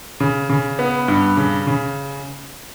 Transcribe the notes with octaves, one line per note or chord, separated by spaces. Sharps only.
C#3
C#3
B3
G2
C#3
C#3